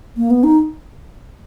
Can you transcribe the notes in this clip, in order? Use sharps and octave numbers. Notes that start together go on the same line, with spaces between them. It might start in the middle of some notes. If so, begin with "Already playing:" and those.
A#3
B3
D#4